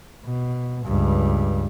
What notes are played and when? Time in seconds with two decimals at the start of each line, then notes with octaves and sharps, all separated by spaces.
0.25 B2
0.85 C#2 G2